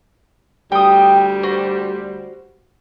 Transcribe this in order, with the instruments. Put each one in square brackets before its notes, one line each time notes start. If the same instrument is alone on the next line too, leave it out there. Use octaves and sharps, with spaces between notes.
[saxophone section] D2 G3 G4 [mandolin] G5 D#6
[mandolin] F#4 C5